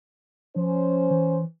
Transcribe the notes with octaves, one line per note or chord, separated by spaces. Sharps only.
F3 C#4 C5
E3